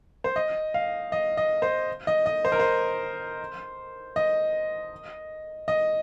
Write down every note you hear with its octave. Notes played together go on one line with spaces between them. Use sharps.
C5
D#5
F5
D#5
D#5
C5
D#5
D#5
C5
A#4
C5
D#5
D#5